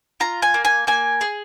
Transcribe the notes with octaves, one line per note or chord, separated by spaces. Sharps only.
F4 A#5
G#5
A#3
G#5
A#3 G#5
G#4